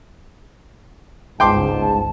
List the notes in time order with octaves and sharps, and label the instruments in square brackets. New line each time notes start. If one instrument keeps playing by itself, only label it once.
[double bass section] G1 C#2 [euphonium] G#2 [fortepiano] G5 C6 D6 [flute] A5